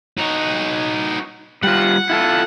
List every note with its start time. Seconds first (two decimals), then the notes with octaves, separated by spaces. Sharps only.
0.18 D#4 F#4
1.63 G3 F4 F#5
2.10 E4 F4 A4